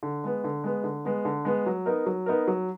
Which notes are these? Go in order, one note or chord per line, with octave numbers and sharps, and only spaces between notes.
D3
G#3 B3
D3
G#3 B3
D3
G#3 B3
D3
G#3 B3
F#3
B3 D#4 A#4
F#3
B3 D#4 A#4
F#3